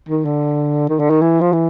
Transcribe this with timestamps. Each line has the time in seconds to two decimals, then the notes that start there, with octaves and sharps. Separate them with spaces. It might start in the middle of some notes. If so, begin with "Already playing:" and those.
0.09 D#3
0.25 D3
0.89 D#3
0.99 D3
1.10 D#3
1.21 E3
1.41 F3
1.52 E3